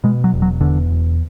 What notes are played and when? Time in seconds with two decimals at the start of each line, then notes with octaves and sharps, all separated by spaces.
0.04 B2 G#3
0.24 F#3
0.33 E1
0.42 F#3
0.61 E2 D3
0.90 E1